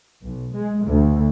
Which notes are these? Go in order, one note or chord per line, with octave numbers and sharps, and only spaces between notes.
B1
G#3
D2